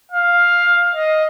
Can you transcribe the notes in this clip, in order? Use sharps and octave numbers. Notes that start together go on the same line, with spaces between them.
F5
D#5